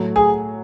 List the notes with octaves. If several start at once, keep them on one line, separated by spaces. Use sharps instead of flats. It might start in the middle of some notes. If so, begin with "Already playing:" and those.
Already playing: A2 F#3 A3
G#4